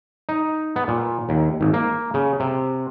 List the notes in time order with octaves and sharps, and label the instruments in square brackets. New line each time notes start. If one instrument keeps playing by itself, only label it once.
[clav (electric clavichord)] D#4
B3
A#2
D#2
G#1
A#3
C#3
C3